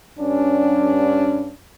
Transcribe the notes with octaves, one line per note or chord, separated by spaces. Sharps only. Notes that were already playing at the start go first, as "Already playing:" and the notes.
G2 C#4 D4